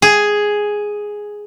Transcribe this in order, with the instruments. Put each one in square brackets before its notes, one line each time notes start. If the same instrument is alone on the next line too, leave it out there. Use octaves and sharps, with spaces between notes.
[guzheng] G#4